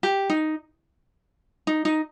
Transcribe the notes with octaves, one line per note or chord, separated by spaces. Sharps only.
G4
D#4
D#4
D#4